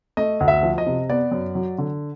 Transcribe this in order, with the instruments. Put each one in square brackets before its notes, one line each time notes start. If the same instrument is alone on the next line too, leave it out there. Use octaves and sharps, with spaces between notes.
[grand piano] A3 D#5
D2
E5
F3
D#5
C3
B3 D5
F#2
F#3
D3